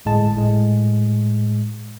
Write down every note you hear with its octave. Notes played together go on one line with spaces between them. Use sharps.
G1 A2 G#3 A5
A2 G#3